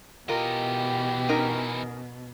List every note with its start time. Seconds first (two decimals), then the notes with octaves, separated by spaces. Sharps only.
0.29 B2 E3 F4 G4 A#4 D#5
1.29 C#4 D#4 A#4